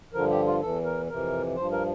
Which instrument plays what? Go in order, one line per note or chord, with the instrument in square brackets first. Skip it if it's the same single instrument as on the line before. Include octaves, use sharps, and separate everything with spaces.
[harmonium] G2 D3 F3 A#4
G4
F4
E2 E3 A4
A#4
F2 C3 E3 A#4
G2 F3 C5
A#4